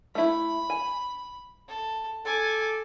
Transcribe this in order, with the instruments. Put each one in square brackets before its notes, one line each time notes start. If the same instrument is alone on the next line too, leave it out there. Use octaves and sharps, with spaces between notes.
[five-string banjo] A3 E4 [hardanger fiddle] B5
[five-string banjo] G#5
[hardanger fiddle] A4
[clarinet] A4 [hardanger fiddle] G#5 D6